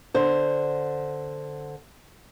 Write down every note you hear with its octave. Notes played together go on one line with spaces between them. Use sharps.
D3 C5